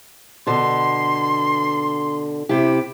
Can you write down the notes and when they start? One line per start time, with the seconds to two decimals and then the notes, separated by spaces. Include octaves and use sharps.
0.47 B2 D3 C6
2.49 C3 E4 G4